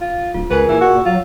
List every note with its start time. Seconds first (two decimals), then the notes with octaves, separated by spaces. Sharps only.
0.01 F4
0.34 D1 F4
0.51 C#2 G#4 A#4 B4 G#5
0.69 A#2 E3 E6
0.81 F#4
1.06 F#3 F4